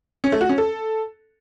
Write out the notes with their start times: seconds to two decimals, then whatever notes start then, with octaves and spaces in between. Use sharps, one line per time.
0.24 C#4
0.32 A3
0.41 F#4
0.49 C#4
0.58 A4